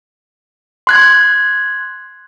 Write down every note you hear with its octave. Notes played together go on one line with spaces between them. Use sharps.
C6 F#6 G#6